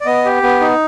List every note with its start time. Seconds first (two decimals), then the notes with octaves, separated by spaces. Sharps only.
0.01 D5
0.06 B3 D#5
0.25 G4
0.43 B3
0.60 D#4